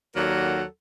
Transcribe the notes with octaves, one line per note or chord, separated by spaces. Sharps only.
D#2 F#3 A4 A#4 D5 F#5